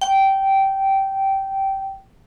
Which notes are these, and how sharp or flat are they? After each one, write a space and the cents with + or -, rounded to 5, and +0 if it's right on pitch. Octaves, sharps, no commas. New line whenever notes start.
G5 -15